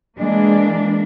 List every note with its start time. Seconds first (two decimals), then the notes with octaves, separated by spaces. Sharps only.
0.18 E3 G#3 A#3 D4